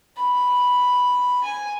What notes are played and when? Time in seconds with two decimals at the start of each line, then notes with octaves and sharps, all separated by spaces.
0.16 B5
1.44 G#5